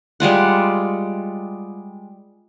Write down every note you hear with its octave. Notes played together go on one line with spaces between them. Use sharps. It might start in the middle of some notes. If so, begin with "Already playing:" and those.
G3 G#3 F4 F#5